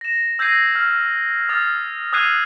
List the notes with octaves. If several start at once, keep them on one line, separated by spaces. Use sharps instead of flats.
A#6 E7
E6 G6 G#6 A#6 C7 D#7
E6 F6
D#6 F6 A6
D#6 E6 F#6 G#6 C7 D#7